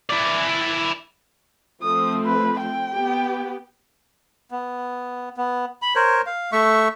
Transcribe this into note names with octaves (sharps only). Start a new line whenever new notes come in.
E4 D5
F3 A3 C4 D#6
B4
G5
B3 G4
B3
B3
B5
A#4 C5 C#5
F5
A3 E5 C#6